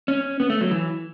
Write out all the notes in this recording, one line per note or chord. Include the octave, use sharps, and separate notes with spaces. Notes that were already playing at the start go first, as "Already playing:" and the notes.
C#4
B3
A3
F#3
E3